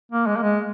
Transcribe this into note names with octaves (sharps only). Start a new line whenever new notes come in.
A#3
G#3
A#3
G#3